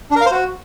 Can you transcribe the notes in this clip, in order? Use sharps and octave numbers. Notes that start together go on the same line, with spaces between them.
D4
A#4
F5
C5
F#4